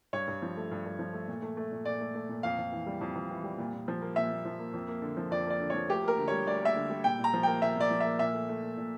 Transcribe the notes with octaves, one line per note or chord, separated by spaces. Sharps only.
G2 C#5
G2
F3
A3
G2
G2
F3
A3
A#2
A3
A3
A#2
A#2 D5
A3
A3
A#2
F2 F5
F2
E3
G3
F2
F2
E3
G3
A#2
A#2
F3
A#3
A#2 E5
A#2
F3
A#3
F2
A#3
D3
F3
F2 D5
A#3 D5
D3
F3 C#5
D2 G4
A#3 A#4
D3
G3 C#5
D2 D5
A#3 E5
D3
G3
A#2 G5
A#2
A#5
F3
A#3 G5
A#2 E5
A#2 D5
F3
A#3 E5
A#2 E5
A3
A3
A#2
A#2